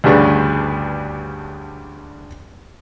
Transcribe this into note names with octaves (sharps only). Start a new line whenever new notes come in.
D2 G2 C#3 D4 B4 C#6